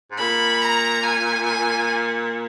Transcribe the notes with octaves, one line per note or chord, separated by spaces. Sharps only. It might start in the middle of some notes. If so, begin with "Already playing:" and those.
G#2
A#2 B5
A#5
G#5
G#5